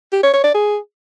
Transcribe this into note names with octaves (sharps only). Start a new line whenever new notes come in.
G4
C#5
C#5
D5
G#4